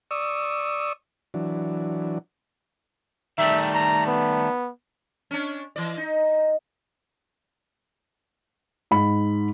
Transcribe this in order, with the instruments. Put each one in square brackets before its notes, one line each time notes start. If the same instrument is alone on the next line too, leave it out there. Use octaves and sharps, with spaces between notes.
[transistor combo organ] D5 C#6 D#6 E6
E3 F#3 D4
[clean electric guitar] D#3 G3 A3 [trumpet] E5
[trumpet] A#5
B3
[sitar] C#4 D4
E3 D5
D#4
[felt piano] G#2 B5